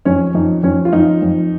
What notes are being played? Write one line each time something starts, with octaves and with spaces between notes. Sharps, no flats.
F2 C#4
F2 D#4
F2 C#4
F4
F2 D#4
F2